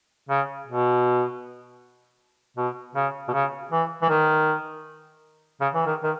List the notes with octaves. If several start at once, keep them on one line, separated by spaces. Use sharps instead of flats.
C#3
B2
B2
C#3
B2
C#3
E3
E3
D#3
C#3
E3
D#3
D#3